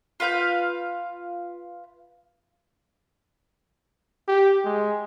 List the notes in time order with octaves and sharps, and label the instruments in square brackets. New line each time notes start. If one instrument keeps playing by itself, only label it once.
[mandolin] F4 B4 F5 G6
[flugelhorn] G4
G#3